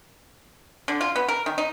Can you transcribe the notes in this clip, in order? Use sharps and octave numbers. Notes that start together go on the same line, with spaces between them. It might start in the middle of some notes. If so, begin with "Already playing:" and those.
D3
F4
B3
A#4
D#3
D#4